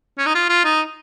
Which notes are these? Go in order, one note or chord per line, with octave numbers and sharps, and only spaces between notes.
C#4
D#4
F4
F4
D#4